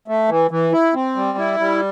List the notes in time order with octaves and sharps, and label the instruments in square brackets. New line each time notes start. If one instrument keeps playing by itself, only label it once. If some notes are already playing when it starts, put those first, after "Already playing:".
[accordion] A3
E3
E3
E4
C4
G3
E4
G3